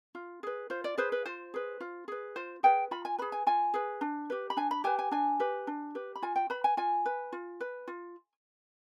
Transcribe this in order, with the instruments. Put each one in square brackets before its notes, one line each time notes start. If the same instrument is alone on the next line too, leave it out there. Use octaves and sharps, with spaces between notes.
[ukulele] F4
G#4 B4
F4 C5
D5
G#4 B4 C5
B4
F4 C5
G#4 B4
F4
G#4 B4
F4 C5
G#4 B4 G5
F4 B5
G#5
G#4 B4 B5
G#5
F4 G#5
G#4 B4
D4
G4 B4
B5
D4 G#5
B5
G4 B4 G#5
G#5
D4 G#5
G4 B4
D4
G4 B4
B5
F4 G#5
G5
B4 B5
G#5
F4 G#5
B4
F4
B4
F4